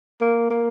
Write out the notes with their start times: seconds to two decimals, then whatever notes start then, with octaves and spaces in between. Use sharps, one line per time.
0.21 A#3
0.50 A#3